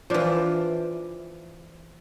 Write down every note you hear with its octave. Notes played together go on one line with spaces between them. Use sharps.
E3 F3 D4 F4